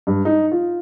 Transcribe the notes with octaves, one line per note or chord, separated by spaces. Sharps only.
G2
D#4
F4